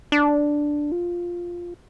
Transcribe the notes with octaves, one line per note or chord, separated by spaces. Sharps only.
D4
F4